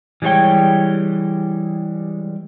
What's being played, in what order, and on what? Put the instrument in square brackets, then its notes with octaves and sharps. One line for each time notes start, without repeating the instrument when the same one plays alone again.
[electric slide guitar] E3 G3 G#3 A#3 C#5 G5